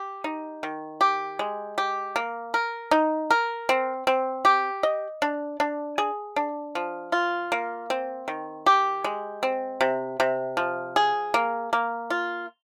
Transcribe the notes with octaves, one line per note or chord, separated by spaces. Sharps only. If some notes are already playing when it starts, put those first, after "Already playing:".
Already playing: G4
D#4
D#3
G4
G#3
G4
A#3
A#4
D#4
A#4
C4
C4
G4
D#5
D4
D4
G#4
D4
F3
F4
A#3
C4
D#3
G4
G#3
C4
C3
C3
F3
G#4
A#3
A#3
F4